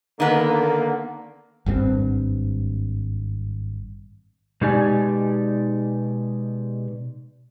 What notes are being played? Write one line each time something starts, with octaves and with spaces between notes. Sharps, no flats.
D3 D#3 A#3 B3
G#1 G2 B2 C4
B2 G#3 D#4 G4 D5 G#5